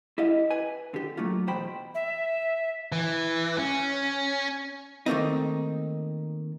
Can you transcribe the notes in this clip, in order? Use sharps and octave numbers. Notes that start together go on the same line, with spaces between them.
E4 G4 D#5 F5
B4 G#5
D3 G4
F#3 A3 A#3 F4
E2 B2 C5 G5 B5
E5
E3
C#4
D#3 A3 A#3 C4 D#4